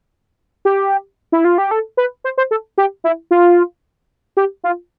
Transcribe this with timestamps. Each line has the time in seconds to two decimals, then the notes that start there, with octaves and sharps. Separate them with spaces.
0.65 G4
1.32 E4
1.45 F4
1.58 G4
1.71 A4
1.97 B4
2.24 C5
2.38 C5
2.51 A4
2.78 G4
3.04 E4
3.31 F4
4.37 G4
4.64 F4